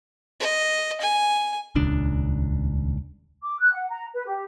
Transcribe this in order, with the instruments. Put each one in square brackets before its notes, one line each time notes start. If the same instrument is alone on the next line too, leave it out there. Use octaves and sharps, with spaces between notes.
[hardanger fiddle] D#5
G#5
[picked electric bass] D#1 C#2 D4
[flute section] D6
F#6
F#5
A#5
B4
G4